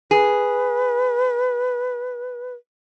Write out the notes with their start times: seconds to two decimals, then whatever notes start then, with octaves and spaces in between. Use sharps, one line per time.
0.11 G#4 B4